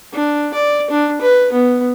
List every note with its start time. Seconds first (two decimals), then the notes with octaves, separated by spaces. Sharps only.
0.13 D4
0.54 D5
0.90 D4
1.21 B4
1.52 B3